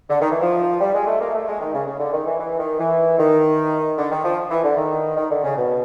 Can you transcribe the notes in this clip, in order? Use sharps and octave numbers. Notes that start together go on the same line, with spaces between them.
D3
D#3
E3
F3
G3
G#3
A3
A#3
A3
G#3
D#3
C#3
C#3
D3
D#3
E3
E3
D#3
E3
D#3
D3
D#3
F3
E3
D3
D#3
D#3
D3
C#3
B2